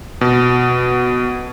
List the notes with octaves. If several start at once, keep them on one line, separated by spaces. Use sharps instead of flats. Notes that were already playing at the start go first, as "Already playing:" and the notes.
B2